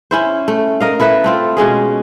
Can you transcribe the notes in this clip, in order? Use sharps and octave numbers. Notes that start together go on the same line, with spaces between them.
C#4 E4 C5
A3
A#4 D#5 F5
E4 A4 B4 E5
A3 C4 F4
B2 G#3 C#4 G#4